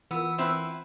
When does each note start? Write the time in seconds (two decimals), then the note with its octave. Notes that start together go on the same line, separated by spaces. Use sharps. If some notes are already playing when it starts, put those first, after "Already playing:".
0.11 E3 B3 F4 A#4 E6
0.38 C4 E4 B4